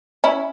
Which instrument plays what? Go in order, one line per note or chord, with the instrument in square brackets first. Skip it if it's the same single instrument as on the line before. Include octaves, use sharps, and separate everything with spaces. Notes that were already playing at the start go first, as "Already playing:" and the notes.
[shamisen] C#4 E4